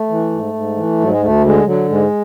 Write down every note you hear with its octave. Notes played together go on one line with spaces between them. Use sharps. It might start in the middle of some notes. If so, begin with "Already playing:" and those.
Already playing: A3
E3
G#2
G#2
E3
G#2 F#3
G#3
D2 A3
D3 G#3
D3 F#3
G#2 G#3